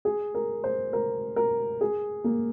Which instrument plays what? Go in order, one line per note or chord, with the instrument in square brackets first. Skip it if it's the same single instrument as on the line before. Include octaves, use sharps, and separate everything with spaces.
[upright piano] G#4
A#4
C5
A#4
A#4
G#4
A#3